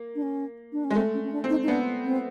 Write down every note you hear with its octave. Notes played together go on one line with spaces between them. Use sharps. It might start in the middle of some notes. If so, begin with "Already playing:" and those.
Already playing: A#3
D4
C#4
D4
C#4
G#3
A3 C4
C#4
C#4
D4
C4
D#4
D#4
B3 D4
C4